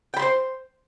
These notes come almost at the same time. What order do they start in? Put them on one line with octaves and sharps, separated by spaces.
G5 B5 C6 C5